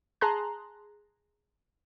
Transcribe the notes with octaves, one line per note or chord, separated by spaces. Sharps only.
G#4 A5 A#5 C6 F#6